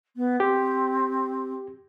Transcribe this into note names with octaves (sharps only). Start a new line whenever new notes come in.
B3
C4 G4